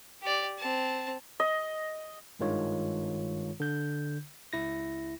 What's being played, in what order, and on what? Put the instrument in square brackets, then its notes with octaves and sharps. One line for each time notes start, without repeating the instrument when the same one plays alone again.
[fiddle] G4 D5
C4 A5
[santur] D#5
[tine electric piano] G#1 G2 D#3 G#3 F4 C#5
D3 G6
C#2 E4 A#6